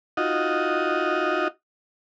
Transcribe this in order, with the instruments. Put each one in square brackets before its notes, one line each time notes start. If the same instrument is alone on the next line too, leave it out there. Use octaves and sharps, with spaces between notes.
[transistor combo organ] D#4 F4 F#4 D#5